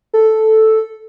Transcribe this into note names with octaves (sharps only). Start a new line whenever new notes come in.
A4